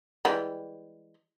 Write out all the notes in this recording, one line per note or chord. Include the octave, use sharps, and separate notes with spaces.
E3 G3 G#3